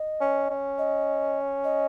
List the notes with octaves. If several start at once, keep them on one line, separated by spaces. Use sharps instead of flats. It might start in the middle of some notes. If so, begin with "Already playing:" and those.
Already playing: D#5
C#4
C#4
D#5
D#5